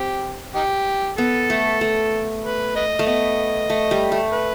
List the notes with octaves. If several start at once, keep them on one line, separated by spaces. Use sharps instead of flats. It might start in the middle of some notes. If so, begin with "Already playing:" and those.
Already playing: C4 G4
D#4 G4
B3 A4
A3
A3
B4
B4 D#5
A3
B3 D#5
A3
G3
A3
B4